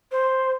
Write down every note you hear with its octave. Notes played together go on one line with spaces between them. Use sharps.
C5